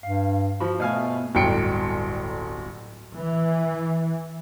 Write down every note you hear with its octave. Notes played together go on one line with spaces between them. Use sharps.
G2 F5
F3 F#4 B5
B2 A3 B3 F5 G#5
D1 G1 G5 C#7 D7
E3